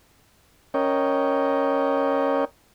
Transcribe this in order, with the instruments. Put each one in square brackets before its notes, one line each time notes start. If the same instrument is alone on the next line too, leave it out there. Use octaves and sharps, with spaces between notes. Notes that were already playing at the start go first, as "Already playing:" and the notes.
[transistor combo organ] C#4 A#4 C#5 D#5 G5